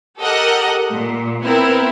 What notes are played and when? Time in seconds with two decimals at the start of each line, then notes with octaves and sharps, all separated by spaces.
0.20 G4 A4 A#4 D#5 F#5
0.92 A#2
1.43 B3 C4 E4 A#4